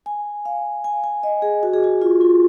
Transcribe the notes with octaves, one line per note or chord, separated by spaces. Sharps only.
G#5
F5
G#5
G#5
D#5
G#4
F#4
G#4
F#4
F4
F4